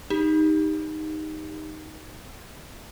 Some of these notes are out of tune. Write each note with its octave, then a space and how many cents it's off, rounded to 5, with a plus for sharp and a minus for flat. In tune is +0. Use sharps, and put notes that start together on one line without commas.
D#4 +0 G4 +20